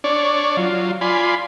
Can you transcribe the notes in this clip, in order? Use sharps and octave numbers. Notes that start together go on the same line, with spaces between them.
D4 C#5 D5
F#3 F4
F4 D5 G#5 B5 C6